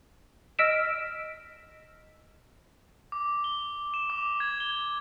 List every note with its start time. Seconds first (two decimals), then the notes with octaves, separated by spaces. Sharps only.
0.59 D#5 E6 F6 B6 D7 E7
3.12 D6
3.44 G7
3.94 E7
4.10 D6
4.40 G#6
4.60 G7